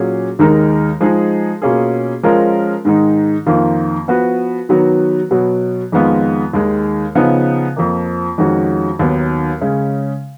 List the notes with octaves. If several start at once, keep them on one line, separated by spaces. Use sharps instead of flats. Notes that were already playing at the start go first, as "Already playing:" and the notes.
Already playing: A#2 F#3 C#4 G#4
D#2 D#3 G#3 D#4 A#4
F3 G#3 D#4 G#4
B2 A#3 C#4 F4 G#4
F3 G#3 C#4 F4 A#4
G#2 D#3 G#3 D#4
F2 D#3 A#3 F4
F3 B3 F#4 B4
D#3 F#3 B3 F#4 B4
B2 F#3 B3
F2 D#3 G#3 B3 F4
D#2 D#3 G#3
C#3 F3 B3 D#4
F2 F3 A#3
F2 D#3 G#3 C#4 F#4
D#2 D#3 F#3 B3
C#3 G#3 C#4